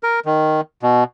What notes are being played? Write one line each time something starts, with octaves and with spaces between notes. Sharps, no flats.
A#4
D#3
B2